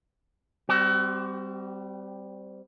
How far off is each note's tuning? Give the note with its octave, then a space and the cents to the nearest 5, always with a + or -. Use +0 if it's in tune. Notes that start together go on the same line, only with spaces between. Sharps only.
G3 +0 C4 -15 F#4 +35